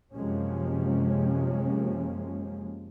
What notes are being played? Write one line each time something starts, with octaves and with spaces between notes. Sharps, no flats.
F#2 C3 F3 G#3 A#3 C#4